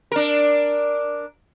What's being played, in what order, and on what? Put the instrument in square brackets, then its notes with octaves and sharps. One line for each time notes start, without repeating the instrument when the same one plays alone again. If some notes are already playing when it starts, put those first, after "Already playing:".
[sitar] D4 A#4